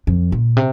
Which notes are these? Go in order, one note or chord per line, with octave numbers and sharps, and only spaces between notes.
F2
A#2
C3